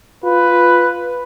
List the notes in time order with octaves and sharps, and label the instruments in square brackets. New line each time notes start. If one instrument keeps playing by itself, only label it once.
[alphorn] F4 [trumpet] B4